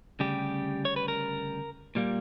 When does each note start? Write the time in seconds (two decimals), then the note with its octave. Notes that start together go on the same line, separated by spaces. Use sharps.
0.20 D2 C#3 G3 G4
0.85 C#5
0.96 B4
1.08 A#4
1.95 A#2 G3 A#3